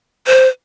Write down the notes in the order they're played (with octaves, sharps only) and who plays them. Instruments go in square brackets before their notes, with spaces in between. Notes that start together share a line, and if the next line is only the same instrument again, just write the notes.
[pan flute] C5